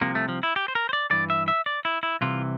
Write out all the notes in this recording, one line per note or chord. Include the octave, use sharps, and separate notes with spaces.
C2 C3 F3 A#3
A3
F3
E4
G4
C5
A#4
C5
D5
G2 E3 D5
E5
E5
D5
E4
E4
C2 C3 E3 F4